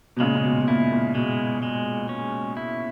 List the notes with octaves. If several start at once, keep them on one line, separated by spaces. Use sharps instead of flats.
B2
A#2 C#3 G#3
C#3
B2
B2
A#2 E4
A#2
B2 G#3
G#3
C#4
E4